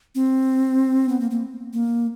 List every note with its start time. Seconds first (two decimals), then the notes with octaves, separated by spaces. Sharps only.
0.15 C4
1.09 B3
1.20 A#3
1.31 A#3
1.73 A#3